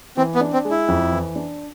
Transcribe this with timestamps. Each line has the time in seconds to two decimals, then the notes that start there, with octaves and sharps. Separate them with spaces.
0.17 E3 C4
0.35 B3
0.41 D4
0.53 C4
0.65 G#3
0.71 E4
0.88 F2
1.12 E3
1.36 D4